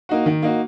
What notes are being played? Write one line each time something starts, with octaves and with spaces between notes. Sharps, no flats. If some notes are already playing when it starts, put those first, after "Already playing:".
A#3 D#4 F#4
D#3
A#3 D#4 F#4